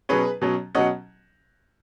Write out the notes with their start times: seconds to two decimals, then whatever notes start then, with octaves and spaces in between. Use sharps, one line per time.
0.09 B2 F#3 C#4 G#4 B4
0.41 B2 F#3 C#4
0.75 B2 F#3 C#4 D#5 F#5